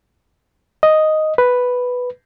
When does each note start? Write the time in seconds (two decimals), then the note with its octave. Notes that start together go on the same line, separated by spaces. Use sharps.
0.83 D#5
1.38 B4